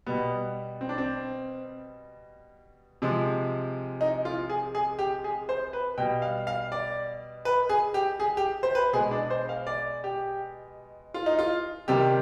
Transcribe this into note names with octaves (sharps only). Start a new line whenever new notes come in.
B2 G3 B3
C4
D4
C4
C3 F3 G#3
D#4
F4
G#4
G#4
G4
G#4
C5
B4
B2 G3 G5
F5
F5
D5
B4
G#4
G4
G#4
G4
C5
B4
B2 G#3 G#4
D4
C5
F5
D5
G4
F4
D#4
F4
C3 D#3 G3 G4